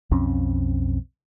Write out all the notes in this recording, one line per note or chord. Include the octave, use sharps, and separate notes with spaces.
B1 F2 C4 C#4